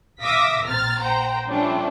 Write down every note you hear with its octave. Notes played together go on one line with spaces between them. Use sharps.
E5 F5 D6 D#6 A#6 B6
A#1 C4 A#5 F6 A6
C5 F#5 G5 A#5
F3 G3 A3 C#4 D4 F4